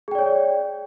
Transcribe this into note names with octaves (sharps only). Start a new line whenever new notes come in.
G#4 C#5 D5 G5